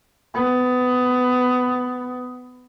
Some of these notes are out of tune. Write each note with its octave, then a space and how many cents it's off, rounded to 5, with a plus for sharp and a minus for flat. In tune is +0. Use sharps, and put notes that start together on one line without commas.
B3 +20